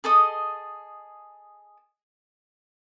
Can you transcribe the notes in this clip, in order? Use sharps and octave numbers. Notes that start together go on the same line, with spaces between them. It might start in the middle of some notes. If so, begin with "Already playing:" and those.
G#4 A4 D#5 D#6